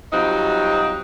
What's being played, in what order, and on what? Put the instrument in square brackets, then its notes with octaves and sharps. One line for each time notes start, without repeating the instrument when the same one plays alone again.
[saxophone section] F#3 G3 C4 D#4 F4 F#4